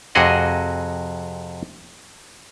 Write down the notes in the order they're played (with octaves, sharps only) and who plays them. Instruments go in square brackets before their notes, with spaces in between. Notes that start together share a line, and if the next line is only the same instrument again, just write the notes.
[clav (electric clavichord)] F2 C3 F#4 G#4 D#5 F#5